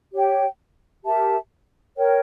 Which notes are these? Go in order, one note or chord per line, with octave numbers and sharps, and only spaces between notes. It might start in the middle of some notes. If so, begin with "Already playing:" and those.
G4 C#5 G5
G4 A#4 E5 A5
A#4 C#5 G5